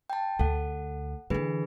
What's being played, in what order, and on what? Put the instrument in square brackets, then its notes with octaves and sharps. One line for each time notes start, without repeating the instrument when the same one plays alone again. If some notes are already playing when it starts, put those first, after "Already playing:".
[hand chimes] G5 A5
[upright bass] D2 [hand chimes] A4 F#5
[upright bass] D3 E3 [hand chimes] D4 G#4 B4